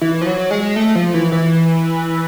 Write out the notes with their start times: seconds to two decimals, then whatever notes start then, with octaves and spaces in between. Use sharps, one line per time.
0.01 E3
0.22 F3
0.26 F#3
0.51 G#3
0.76 A3
0.95 F3
1.14 E3
1.32 E3